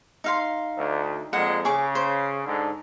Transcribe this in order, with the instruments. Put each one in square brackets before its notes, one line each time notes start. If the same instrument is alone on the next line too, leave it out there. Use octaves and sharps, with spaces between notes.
[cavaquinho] D#4 F5 C6
[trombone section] D2
[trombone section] F2 A#2 G#3 [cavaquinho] F#5
[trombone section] C#3 [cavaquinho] G#4 C#6 D6
[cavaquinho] C5
[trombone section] G#2 D3